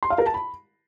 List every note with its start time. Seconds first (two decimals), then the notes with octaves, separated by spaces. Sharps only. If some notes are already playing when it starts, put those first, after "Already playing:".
0.03 C6
0.10 F5
0.18 A#4
0.26 A5
0.34 B5